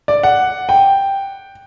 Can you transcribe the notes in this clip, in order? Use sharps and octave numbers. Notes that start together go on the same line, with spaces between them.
D5
F#5
G5